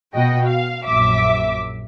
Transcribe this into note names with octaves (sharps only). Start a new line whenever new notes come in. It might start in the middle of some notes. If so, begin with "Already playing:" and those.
B2 F#4 D#5 G5
F5
A#1 F#2 E5 D6